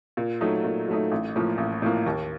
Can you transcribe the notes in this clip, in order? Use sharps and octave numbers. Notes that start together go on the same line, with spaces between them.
A#2
F#3 A3 D#4
A#2
F#3 A3 D#4
A1
A2 F3 A#3
A1
A2 F3 A#3
D#2